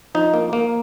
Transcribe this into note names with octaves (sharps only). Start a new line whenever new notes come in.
F3 D#4
A#3
A#3